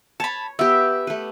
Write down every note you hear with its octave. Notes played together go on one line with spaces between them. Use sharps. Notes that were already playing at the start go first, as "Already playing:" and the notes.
C#5 A5 B5
B3 G4 E5
A3 B4